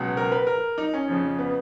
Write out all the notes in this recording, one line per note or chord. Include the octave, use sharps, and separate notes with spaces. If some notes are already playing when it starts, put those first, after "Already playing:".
Already playing: C#2 B2 F#3
A#4
B4
A#4
D#4
C#4
F2 C#3 F3
B3